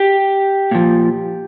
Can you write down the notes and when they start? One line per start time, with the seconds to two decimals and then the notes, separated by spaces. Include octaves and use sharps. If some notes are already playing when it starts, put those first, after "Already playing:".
Already playing: G4
0.71 A#2 F3